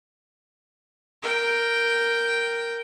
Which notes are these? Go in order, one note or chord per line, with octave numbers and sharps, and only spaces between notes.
A#4 G5